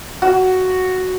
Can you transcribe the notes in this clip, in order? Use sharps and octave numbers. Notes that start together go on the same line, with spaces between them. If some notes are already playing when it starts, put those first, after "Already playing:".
F#4